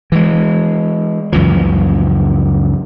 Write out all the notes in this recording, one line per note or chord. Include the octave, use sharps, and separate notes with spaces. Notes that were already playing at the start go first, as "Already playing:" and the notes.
E3 G#3
C#2 F#2 E3 F3